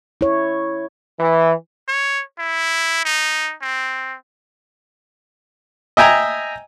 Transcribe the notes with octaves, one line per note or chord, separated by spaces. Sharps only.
E4 C#5
E3
C#5
E4
D#4
C4
D#5 E5 G5 G#5 A#5